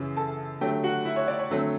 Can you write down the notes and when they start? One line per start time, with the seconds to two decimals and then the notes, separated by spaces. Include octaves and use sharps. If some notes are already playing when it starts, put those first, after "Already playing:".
Already playing: F#2 C#3 E3
0.17 A4 A5
0.61 D3 F#3 A3 G4 G5
0.84 F#4 F#5
1.05 E4 E5
1.16 C#5
1.28 D5
1.39 C#5
1.50 D3 F#3 A3 C4